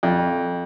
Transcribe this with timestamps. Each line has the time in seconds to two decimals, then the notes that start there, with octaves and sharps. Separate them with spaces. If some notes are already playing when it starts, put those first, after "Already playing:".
0.03 F2